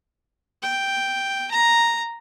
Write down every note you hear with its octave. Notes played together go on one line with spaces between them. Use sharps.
G5
A#5